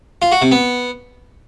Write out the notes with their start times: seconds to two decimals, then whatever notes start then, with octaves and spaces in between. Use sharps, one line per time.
0.22 F4
0.32 F#4
0.42 C3
0.51 B3